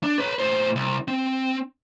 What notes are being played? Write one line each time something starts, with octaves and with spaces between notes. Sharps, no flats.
D4
B4 C#5
A2 C5
C2
C4